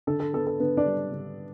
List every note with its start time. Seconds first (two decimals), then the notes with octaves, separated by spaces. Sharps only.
0.07 D3 A4
0.20 A4
0.33 B3 A4
0.47 A4
0.60 D3 B3 B4
0.77 D4 D5
0.86 G3
1.12 D3